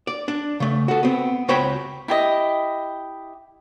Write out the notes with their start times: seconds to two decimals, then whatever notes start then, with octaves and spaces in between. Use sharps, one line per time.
0.07 D5
0.28 D4
0.60 C#3 A3
0.88 F#4 A4
1.03 B3 C4
1.48 C#2 F#4 C5 C#5 G5 B5
2.08 E4 G4 D#5